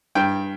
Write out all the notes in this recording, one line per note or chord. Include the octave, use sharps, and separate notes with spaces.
G2 G5